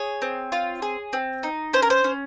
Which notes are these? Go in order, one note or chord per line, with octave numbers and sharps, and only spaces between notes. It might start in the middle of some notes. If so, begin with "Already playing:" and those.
Already playing: G#4 C#5
C4
F4
G#4
C4
D#4
C#4 C5
A#4
C5
C#4